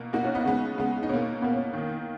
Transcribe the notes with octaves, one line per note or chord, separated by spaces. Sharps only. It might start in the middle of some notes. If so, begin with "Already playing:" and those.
Already playing: B2 A#3
B2 A#3 D#4 F#4
C#4 F4
B3 D#4
C#3 G#3 B3
C#3 G#3 B3
D#4
B2 A#3 C#4
B2 A#3 B3
C#4
D#3 A#3